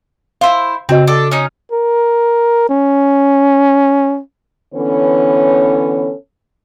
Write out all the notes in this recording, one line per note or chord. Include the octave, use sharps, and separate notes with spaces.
E4 C5 F5
C#3 C4 F#4 D#5
D4 A4
C#4 D#4
A#4
C#4
D3 E3 B3 C#4 A4 C#5